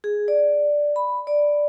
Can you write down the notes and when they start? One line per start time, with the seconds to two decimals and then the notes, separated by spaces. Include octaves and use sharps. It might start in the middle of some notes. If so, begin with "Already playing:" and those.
0.04 G#4
0.28 D5
0.96 B5
1.27 D5